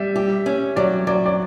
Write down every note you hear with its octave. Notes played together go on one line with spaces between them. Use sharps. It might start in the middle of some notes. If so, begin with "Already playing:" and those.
Already playing: G3 E5
G4
C#4
F#3 D5
F#3 D5
D5